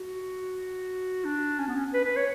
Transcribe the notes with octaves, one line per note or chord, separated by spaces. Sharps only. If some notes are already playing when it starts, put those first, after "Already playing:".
Already playing: F#4
D4
C#4
B3
C#4
B4
B4
C#5